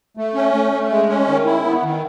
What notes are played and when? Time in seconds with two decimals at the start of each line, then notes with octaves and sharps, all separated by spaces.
0.17 A3
0.35 C#4
0.54 A3
0.72 A3
0.90 G#3
1.09 C#4
1.27 D#3
1.46 E4
1.64 B3
1.83 D#3